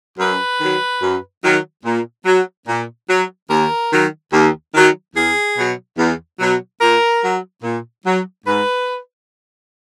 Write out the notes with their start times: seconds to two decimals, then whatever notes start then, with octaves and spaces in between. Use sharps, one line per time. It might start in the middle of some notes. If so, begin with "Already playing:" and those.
0.19 F#2 B4
0.60 D#3 F#3
1.02 F#2
1.43 D#3 F#3
1.84 A#2
2.26 F#3
2.68 A#2
3.08 F#3
3.49 D#2 A#4
3.91 D#3 F#3
4.32 D#2
4.74 D#3 F#3
5.15 E2 G#4
5.57 B2 F#3
5.98 E2
6.40 B2 F#3
6.81 A#2 A#4
7.22 F#3
7.63 A#2
8.05 F#3
8.46 G#2 B4